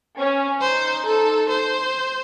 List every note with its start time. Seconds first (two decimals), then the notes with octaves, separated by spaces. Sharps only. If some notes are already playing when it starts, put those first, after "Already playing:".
0.18 C#4
0.61 D#4 C5
1.06 A4
1.50 C5